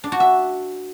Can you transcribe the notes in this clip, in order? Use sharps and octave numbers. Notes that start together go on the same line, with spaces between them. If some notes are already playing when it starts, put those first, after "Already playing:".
D4
F#4
E5